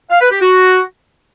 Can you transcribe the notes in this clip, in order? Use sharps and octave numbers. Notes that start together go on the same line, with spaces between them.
F5
B4
G4
F#4